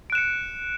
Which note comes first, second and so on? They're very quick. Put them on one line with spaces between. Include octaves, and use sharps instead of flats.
D7 F#6 E7 C#7